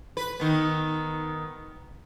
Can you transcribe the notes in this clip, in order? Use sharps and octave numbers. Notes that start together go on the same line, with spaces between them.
B4
D#3 B3